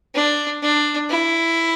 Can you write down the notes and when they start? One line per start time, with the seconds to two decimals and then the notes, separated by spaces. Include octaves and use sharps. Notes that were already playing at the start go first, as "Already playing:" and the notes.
0.15 D4
0.63 D4
1.10 E4